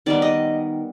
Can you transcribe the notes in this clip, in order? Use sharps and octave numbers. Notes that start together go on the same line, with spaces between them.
D#3 G3 B3 D5
D#5